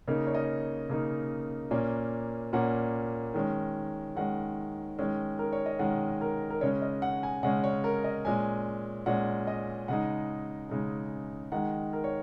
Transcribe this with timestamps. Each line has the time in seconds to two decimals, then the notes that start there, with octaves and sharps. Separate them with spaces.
0.08 C#3 A#3 D#4 A#4
0.27 C#5
0.35 D#5
0.89 C#3 A#3 D#4
1.71 A#2 A#3 C#4
2.53 A#2 A#3 C#4 F#5
3.34 D#3 G#3 C#4
4.16 D#3 G#3 C#4 F#5
4.99 D#3 G#3 C#4
5.39 A#4
5.53 C#5
5.66 D#5
5.79 D#3 G#3 C#4 F#5
6.21 A#4
6.50 A#4
6.61 C#3 G#3 C#4 C#5
6.82 D#5
7.02 F#5
7.23 G#5
7.43 C#3 G#3 C#4 F#5
7.64 C#5
7.84 A#4
8.04 D#5
8.25 A#2 G#3 C#4 G#5
9.06 A#2 G#3 C#4 F#5
9.47 D#5
9.88 C#3 G#3 D#4 F#5
10.70 C#3 G#3 D#4
11.52 D#3 G#3 D#4 F#5
11.93 A#4
12.04 C#5